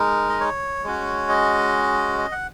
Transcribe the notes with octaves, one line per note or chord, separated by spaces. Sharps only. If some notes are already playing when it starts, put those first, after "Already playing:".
Already playing: G#3 D#4 A#4
D#5
C#5
G#3 C#4 F#4
D#5
D#5
F#5